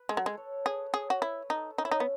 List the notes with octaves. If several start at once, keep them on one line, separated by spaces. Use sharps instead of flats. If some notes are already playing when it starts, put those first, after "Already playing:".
Already playing: B4
G#3 A4
F#3
G#3
C#5
G#4 B4
G#4 C#5
F#4
E4 B4
D#4 A4
C#4 D#4
E4
D#4
B3